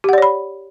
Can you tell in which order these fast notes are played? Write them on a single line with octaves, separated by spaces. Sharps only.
G4 F#5 D5 C#5 B5